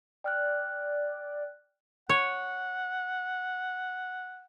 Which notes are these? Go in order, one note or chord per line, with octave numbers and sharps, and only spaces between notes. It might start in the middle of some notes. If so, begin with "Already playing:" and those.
D5 G5 F6 F#6
C#5 F#5